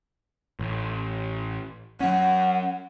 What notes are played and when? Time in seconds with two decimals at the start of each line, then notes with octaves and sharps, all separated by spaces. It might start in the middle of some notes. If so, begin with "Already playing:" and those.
0.59 A1
2.00 F#3 C#4 F#5